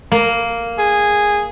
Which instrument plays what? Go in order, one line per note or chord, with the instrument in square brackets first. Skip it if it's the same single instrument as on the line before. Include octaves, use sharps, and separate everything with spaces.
[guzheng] A#3
[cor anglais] G#4